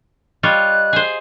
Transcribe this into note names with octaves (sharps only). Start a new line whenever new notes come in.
G3 F4 C#5 D#5 F#6
G#4 C5